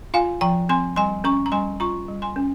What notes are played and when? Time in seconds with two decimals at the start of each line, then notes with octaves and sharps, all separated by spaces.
0.14 F4 F5 G#5
0.41 F3 G5 A#5
0.69 C4 G#5 C6
0.96 G3 G#5 C6
1.24 C#4 A#5 C#6
1.46 A#5
1.52 G3 G#5 C6
1.80 F4 A#5 C#6
2.08 G3
2.22 G#5 C6
2.36 C#4